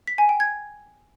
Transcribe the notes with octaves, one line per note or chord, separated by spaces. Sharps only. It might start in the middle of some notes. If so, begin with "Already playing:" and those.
B6
G#5
G5
G#6